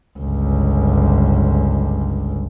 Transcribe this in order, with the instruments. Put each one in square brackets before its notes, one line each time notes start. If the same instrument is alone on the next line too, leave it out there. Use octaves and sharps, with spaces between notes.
[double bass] G1 C#2